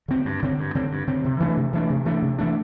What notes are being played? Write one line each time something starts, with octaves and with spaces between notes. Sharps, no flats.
D3 C4
G2
D3 C4
G2
D3 C4
G2
D3 C4
C3
E3 A3 D4
C3
E3 A3 D4
C3
E3 A3 D4
C3
E3 A3 D4